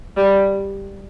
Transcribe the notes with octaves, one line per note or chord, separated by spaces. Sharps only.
G3